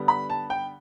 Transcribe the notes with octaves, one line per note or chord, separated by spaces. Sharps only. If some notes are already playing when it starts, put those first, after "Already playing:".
Already playing: D3 G3 B3
B5
A5
G5